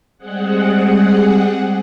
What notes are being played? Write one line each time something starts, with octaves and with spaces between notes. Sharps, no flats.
G3 G#3 C4 G#4 F#5